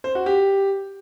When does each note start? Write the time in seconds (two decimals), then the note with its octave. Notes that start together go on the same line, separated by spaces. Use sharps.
0.04 C5
0.15 F#4
0.26 G4